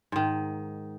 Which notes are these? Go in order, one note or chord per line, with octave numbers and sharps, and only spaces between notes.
G#2 D#3